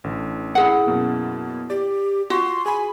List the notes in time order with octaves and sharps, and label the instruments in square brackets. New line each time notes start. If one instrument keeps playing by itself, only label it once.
[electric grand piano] A1 D3
[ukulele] E4 G#4 F#5
[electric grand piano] F#2 B2 A#3
[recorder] G4 [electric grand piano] D5
[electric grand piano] F4 [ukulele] F#4 [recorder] C6
[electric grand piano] G#4 B5 [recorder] G#5